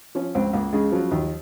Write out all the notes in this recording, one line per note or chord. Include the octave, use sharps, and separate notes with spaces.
F3 C#4
C#2 C4
C#2 A#3
C#3 G#3
F3 F#3
D#2